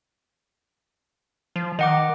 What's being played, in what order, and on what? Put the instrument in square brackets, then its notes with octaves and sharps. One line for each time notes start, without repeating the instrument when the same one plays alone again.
[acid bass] F3
[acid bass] D#3 [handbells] D#5 F#5 D6